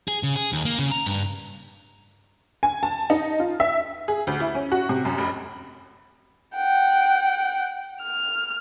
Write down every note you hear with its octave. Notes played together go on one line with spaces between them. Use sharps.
G#4
C#3
G#4
D#2
A#3
C#3
A#5
G2
G#5
A5
D#4
F4
E5
G#4
D2
E4
C#4
F#4
C3
F#2
F1
F#5 G5
F6